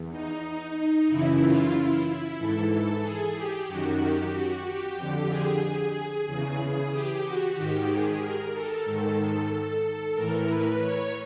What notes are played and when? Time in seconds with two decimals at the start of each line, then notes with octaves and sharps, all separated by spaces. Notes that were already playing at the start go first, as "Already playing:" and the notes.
Already playing: E2
0.11 D#4
0.44 D#4
1.08 F#2 C#3 E3 E4
1.40 F4
1.73 E4
2.38 G#2 E3 A4
2.71 A4
3.03 G#4
3.35 G4
3.67 F#2 D#3 F#4
4.00 G4
4.32 F#4
4.65 G4
4.97 F2 D3 G4
5.29 G#4
5.62 G#4
6.27 E2 C#3 E3
6.91 G4
7.23 F#4
7.56 G#2 D#3 G4
7.89 G#4
8.21 A#4
8.53 A4
8.85 G#2 D#3
10.14 A2 E3 A#4
10.47 B4
10.80 C#5